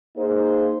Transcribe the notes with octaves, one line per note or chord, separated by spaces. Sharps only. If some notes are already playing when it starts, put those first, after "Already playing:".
A#3 D#4 G#4 C5